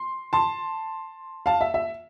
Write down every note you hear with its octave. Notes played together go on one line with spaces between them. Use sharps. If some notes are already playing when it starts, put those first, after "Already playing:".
Already playing: C6
A5 C6
F5 A5
E5
E5